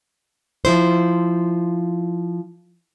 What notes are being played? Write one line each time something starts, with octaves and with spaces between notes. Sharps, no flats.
F3 E4 C5